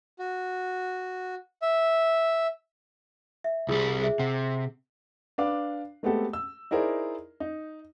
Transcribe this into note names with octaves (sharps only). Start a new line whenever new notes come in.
F#4
E5
E5
C2 G3 F4 G#4
G#4 C5 E5
C3 F#5
D4 B4 F5 D6
G#3 A3 B3 C4 G4 A4
E6
D#4 E4 G#4 A#4 C5 D5
D#4